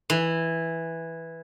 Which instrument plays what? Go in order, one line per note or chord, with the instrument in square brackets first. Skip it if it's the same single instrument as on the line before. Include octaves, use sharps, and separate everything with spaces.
[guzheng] E3